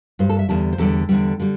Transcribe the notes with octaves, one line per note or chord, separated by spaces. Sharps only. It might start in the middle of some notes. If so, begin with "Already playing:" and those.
G2 G3 C5
A4
E5
E2 D3 G3 A5
C5
E2 D3 G3 A4
E2 D3 G3
D3 G3